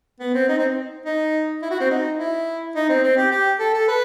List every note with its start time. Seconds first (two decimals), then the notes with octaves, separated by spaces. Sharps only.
0.20 B3
0.35 C4
0.48 D#4
0.59 C4
1.06 D#4
1.62 E4
1.71 F#4
1.80 C4
1.91 D#4
2.18 E4
2.76 D#4
2.89 C4
3.04 C4
3.17 G4
3.31 G4
3.60 A4
3.74 A4
3.88 B4